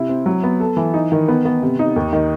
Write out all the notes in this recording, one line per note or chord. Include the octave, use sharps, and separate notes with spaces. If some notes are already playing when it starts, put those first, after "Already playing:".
Already playing: C3 E4
C4
F#3
B3
A4
E3
D#4
D#3
B3
B3
C3
D#4
D#2
D#3